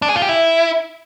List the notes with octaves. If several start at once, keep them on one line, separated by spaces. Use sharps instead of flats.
D4
G#4
F4
G4
E4